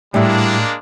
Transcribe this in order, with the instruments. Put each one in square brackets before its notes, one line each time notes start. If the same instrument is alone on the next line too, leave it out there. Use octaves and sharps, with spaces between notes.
[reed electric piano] A2 [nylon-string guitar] G3 E4 [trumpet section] G#3 A#3 D4